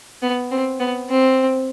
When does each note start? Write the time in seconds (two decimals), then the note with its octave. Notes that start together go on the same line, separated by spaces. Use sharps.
0.22 B3
0.51 C4
0.80 B3
1.10 C4